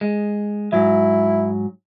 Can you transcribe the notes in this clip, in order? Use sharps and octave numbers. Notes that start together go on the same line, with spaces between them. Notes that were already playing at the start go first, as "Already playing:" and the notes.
G#3
G#2 F#3 E4